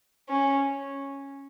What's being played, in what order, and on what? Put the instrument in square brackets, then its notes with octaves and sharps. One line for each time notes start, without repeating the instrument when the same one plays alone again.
[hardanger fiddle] C#4